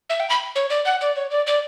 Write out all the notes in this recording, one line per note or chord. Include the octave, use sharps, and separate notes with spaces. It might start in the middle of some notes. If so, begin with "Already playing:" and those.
E5
G5
B5
C#5
D5
F#5
D5
C#5
D5
D5